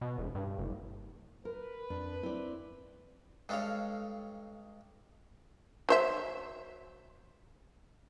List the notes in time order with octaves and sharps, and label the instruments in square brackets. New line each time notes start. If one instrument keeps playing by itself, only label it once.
[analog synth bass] B2
E1
G2
F#1
[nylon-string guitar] A#4 [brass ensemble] B4
[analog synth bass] F2 [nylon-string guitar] D4
[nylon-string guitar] C4 D5 [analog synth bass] E4
[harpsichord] G2 G#3 C#4 [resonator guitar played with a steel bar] A4 F5
[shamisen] F#3 C5 E5